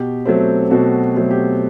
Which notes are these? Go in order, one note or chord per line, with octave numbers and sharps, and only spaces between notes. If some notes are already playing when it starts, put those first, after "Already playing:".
Already playing: B2 G4
F#3 A3 C4
B2 F#4 A4
F#3 A3 C4
G4